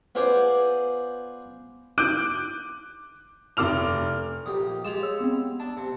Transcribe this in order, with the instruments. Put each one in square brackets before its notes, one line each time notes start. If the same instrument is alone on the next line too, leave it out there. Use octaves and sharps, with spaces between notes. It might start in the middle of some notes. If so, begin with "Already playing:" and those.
[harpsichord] B3 F4 G#4 C5 D5 G#5
[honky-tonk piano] D6 F#6 G6 D7 D#7
F1 D6 F6 F7
[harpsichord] A#1 G4 [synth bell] D#6
[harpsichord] G#3 F4 G4 [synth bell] E7 F7
[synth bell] C#5 E6
B3 C4
[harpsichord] D4 [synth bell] A5
[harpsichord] C3